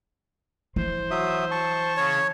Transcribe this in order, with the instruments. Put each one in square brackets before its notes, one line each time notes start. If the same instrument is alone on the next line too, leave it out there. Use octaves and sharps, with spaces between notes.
[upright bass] E3 [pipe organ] C5
[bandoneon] F#3 E5 D#6
A5 C#6
[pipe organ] C#3 [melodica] C#5